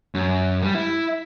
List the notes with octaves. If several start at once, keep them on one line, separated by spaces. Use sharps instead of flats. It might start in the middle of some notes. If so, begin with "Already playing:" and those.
F#2
G3
E4